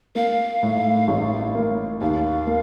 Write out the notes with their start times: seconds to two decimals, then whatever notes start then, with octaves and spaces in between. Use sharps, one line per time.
0.15 A#3 F5
0.63 A2
1.08 A1
1.55 A#3
2.01 D#2 F5
2.47 A#3